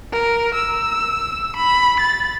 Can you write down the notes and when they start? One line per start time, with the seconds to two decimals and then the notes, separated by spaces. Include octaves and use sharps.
0.12 A#4
0.55 E6
1.57 B5
2.00 A6